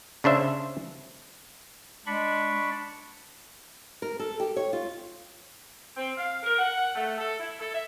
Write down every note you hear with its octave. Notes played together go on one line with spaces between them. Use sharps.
C#3 D4 C5 E5
G#3 D4 B5 C#6
A#4
A4
G4
C#5
F4
C4
F5
A#4
F#5
A3
A4
E4
A4
E5